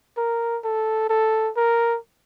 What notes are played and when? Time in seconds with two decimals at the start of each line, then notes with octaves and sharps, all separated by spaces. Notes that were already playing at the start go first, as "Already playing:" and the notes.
0.17 A#4
0.64 A4
1.10 A4
1.56 A#4